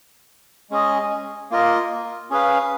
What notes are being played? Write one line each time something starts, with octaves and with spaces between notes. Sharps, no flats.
G#3 C#4 G#4 D#5
A#3 F4 A#4 D#5
C#4 G#4 B4 F5